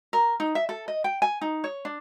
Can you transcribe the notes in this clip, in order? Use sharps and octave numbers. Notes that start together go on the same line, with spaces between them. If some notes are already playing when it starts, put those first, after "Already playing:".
A#4
D#4
E5
A4
D#5
G5
G#5
D#4
C#5
D4